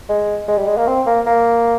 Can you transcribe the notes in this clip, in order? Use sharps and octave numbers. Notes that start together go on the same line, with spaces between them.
G#3
G#3
G3
G#3
A#3
C4
A#3
A#3